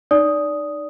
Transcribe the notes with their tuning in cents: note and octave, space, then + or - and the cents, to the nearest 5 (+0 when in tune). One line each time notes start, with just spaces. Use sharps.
D#4 -25 D5 -20 D#6 +0